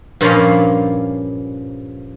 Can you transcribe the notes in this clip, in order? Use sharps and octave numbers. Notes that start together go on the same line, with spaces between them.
G2 A#2 F3 C#4 F5